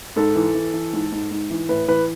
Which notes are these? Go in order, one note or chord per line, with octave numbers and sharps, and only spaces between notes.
G#2 A4
E3
E3
E3
G#2
G#2
G#2
E3
A2 B4
E3 B4